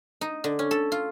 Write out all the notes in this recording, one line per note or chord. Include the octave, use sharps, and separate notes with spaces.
D#4
D3
C#4
A4
F4